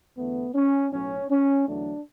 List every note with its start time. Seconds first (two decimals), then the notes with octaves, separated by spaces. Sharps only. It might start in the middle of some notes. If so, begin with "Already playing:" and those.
0.17 E2 D3 A3 B3
0.54 C#4
0.92 B1 A2 F#3 C#4
1.30 C#4
1.67 E2 D3 F#3 A3 D4